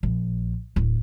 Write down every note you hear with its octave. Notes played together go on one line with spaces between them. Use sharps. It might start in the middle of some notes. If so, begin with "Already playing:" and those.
A#1
D1